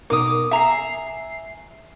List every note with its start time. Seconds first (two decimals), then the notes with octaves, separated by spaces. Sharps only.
0.10 B2 D#4 A#4 D6 D#6
0.51 E5 G#5 A#5 C7